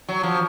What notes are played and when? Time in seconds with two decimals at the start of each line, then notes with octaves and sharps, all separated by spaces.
0.09 F#3
0.23 F3